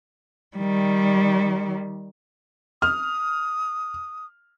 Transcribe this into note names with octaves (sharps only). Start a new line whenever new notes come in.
D#3 G3
D#6 F6